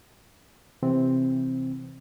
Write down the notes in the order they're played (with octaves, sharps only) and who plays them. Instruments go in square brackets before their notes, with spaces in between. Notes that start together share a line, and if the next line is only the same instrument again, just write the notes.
[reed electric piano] C3 E3 C4